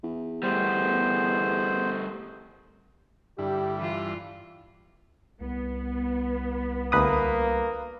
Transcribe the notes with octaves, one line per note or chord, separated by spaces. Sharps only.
E2
G3 A3 B3 C5
G2 D3 G3 E4 G4
E3 F4
C2 B3
D2 A#3 B4 D#6